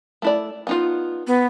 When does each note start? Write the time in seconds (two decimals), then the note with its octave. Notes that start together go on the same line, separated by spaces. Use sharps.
0.22 A3 E4 D5
0.67 B3 D#4 F4
1.27 B3